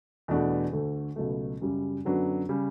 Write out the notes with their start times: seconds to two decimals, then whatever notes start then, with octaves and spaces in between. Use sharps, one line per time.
0.28 E2 B2 A3 D4 F#4
0.72 D2 D3 A3
1.16 C#2 B2 F#3 A3
1.61 F#2 C#3 G3
2.05 F#2 D3 F#3 B3 D4
2.49 C#3 G3